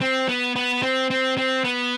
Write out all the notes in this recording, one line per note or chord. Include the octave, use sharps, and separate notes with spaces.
C4
B3
B3
C4
C4
C4
B3